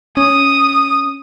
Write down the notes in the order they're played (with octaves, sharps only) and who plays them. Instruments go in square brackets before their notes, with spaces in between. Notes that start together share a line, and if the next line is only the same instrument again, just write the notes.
[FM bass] C#4 [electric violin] D#6